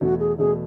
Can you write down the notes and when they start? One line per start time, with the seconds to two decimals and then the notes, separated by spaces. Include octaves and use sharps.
0.01 E2 B2 A3 F#4
0.20 G#4
0.38 E2 B2 A3 G#4